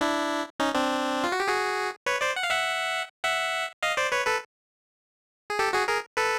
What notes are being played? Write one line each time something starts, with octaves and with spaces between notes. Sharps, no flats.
D4 E4
C#4 D#4
C4 D4
F4
F#4
G4
F#4 G#4
B4 C#5
C5 D5
F#5
F5
E5 F#5
E5 F#5
D#5 F5
C5 D5
B4 C#5
A4 B4
G#4
G4 A4
F#4 G#4
G#4 A#4
A4 B4